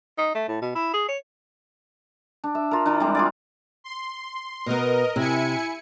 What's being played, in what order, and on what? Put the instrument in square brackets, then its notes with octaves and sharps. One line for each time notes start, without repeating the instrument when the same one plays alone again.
[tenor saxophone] D#4
A3
A2
B2
E4
G#4
C#5
[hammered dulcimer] D4
E5
F4 A#4
E3 D4
G3 G#3 C4 D6
F4 G#4 D5
[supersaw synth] C6
[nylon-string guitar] B2 B3 [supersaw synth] A#4 D#5
[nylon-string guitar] C3 [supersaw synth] E4 G#5 C#7